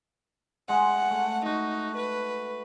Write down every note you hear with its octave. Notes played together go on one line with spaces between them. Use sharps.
G#3 F#5
A3
D#4 F#4
B4